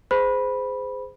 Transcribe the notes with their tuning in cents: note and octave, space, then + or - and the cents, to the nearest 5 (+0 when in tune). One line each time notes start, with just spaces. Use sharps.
G#4 -5 C5 -25 B5 -10